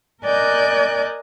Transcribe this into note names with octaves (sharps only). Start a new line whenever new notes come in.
A#4 D5 D#5 G#5 F#6 G6